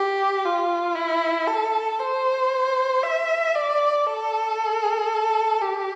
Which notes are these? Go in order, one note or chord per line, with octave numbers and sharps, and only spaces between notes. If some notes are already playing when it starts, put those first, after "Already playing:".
Already playing: G4
F4
E4
A4
C5
E5
D5
A4
G4